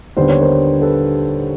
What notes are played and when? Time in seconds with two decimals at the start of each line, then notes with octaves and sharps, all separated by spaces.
0.17 D#2 D3 G3 B3 C5
0.29 C#5
0.41 A#4 C5
0.82 A4 B4